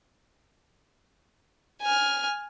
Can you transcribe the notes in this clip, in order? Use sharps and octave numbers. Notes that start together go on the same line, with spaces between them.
G#5 F6